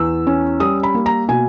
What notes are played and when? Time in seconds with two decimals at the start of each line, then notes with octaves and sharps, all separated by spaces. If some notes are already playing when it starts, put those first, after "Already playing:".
Already playing: E2 E6
0.27 C#4
0.60 G3 D#6
0.83 B5
0.95 A#3
1.06 A#5
1.28 B2 G#5